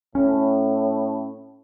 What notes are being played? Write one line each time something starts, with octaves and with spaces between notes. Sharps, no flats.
A2 C#4